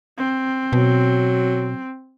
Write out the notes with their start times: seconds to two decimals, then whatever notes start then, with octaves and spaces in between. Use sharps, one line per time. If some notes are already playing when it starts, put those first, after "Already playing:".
0.18 C4
0.73 B2 F#3